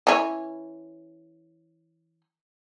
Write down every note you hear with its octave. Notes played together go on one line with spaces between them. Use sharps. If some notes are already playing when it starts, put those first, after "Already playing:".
E3 C#4